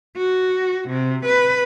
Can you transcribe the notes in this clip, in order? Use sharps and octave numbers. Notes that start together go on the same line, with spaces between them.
F#4
C3
B4